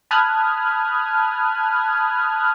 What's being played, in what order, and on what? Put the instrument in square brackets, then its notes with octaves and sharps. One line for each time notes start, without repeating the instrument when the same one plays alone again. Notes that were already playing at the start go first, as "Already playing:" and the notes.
[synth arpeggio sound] A5 B5 D#6 F6 F#6 G#6